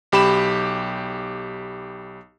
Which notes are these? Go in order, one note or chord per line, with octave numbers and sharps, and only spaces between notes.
B1 G4 B5 E7